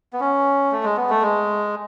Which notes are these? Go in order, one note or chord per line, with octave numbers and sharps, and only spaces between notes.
B3
C#4
A3
G#3
B3
A3
G#3